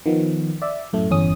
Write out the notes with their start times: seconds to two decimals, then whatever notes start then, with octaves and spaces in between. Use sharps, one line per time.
0.06 D#3 F3 B3
0.62 D5 E5
0.93 F#2 A2 A3
1.10 G1 E2 C#4 D#6